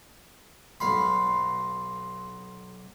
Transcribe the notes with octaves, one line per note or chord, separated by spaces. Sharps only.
B1 F5 B5 C6